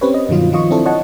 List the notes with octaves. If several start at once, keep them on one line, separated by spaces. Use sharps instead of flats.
C4 C#4 G4 B4 C#5
D#5
G2 B2 D#3 F#3 F4
D#3 F3 F4 D#5 C#6
C4 D4 E4 A4
C#5 D#5 F#5 A5 C#6